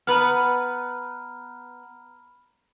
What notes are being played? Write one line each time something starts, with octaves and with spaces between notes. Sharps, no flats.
B3 B4 A#5 B5 F6